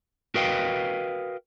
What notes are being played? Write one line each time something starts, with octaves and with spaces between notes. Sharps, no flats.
F#4 A#4 B4 D#5 F5 G5